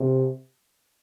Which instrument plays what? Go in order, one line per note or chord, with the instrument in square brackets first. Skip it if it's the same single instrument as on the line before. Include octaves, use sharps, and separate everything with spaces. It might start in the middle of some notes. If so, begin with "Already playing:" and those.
Already playing: [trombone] C3